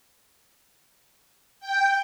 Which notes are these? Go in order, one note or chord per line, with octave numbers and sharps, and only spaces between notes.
G5